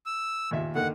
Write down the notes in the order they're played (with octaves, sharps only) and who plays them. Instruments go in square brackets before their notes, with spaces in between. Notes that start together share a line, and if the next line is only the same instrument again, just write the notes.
[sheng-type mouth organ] E6
[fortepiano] D#2 A#2 E5
[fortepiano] D3 D#3 A#3 [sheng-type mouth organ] F#5